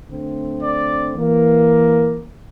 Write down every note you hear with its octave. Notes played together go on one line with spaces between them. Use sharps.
D3 A3 C4
D5
E3 A#3